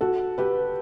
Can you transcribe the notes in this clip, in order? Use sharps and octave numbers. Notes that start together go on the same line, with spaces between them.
F#4 A4
G4 B4